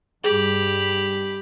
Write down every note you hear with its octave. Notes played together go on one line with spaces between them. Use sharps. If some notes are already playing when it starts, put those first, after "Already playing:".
G2 G4 G#4 B5